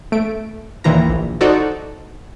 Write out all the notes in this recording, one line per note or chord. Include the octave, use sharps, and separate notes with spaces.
A3 D7
D#2 A#2 D#3 E3 F4 A#5
A#1
D#4 F#4 A4 C5 D5